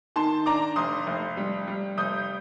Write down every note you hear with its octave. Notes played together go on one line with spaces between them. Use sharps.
D#3 A5 C6
D4 A#5 D6
F1 C6 D#6
F1
G3
G3
F1 D#6 G6